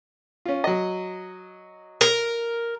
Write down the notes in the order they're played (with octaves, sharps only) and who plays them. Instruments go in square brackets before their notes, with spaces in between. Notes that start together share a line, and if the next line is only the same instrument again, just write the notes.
[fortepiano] C#4 F4
F#3 D#5
[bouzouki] A#4